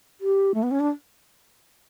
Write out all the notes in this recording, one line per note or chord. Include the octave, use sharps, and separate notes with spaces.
G4
A3
B3
C#4
D4